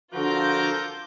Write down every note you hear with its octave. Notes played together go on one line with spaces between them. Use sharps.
D3 F3 F4 F#4 A4 A#4 D6 G6